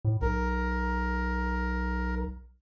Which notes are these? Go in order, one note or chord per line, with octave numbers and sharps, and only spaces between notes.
A2
B1 A#4